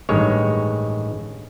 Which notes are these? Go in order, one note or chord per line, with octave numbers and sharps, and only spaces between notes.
A1 G2 D#3 G#3 C#5